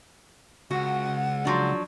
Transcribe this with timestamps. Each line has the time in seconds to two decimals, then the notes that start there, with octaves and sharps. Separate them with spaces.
0.71 C#2 F#4 F#5
1.45 F3 F#3 D4